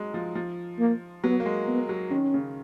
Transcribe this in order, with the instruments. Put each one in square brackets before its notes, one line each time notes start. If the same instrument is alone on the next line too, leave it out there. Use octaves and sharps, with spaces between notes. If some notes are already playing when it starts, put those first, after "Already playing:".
Already playing: [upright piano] F#3 G#3
F3
F3
[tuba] A#3
[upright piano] F#3 [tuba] B3
[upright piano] A#3
G#3
[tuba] B3
[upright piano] F#3
[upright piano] D#3 [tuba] C#4
[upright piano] C#3